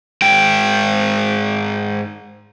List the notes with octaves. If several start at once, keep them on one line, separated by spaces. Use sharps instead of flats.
G#2 G5